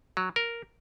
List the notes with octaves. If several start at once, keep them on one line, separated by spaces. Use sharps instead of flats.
F#3
A#4